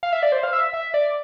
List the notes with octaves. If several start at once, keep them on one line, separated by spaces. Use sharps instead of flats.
F5
E5
D5
C5
F5
E5
E5
D5